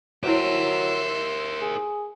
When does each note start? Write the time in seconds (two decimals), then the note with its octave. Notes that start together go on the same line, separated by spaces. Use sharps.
0.23 F#3 E4 G4 A#4 C5 C#5 E5 C6
1.61 G#4